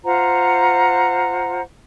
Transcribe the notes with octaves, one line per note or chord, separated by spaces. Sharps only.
F4 C5 F#5 A#5